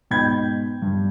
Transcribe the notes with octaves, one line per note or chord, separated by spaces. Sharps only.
G#2 B2 G5 B5 G6 G#6
G2